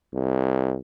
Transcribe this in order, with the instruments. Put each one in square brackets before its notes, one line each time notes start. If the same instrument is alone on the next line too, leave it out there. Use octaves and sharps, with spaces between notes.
[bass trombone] C2